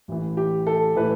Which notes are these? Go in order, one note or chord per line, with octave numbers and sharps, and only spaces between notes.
A1 A2 E3
G4
A4
A2 E3 B4